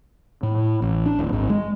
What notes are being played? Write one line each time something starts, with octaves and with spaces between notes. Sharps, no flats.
A2
A1
D4
D1
G#1
G#3